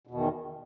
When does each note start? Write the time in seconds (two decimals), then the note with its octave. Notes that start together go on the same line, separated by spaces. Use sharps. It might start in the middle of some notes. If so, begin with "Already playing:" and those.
0.07 B2
0.11 E2
0.14 D#3